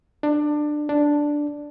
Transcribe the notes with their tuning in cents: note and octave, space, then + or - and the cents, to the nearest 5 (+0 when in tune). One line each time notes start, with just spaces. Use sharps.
D4 +20
D4 +0